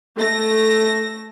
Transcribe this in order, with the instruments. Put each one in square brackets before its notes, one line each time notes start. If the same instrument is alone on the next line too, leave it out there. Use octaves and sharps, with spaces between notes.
[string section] A3 A#6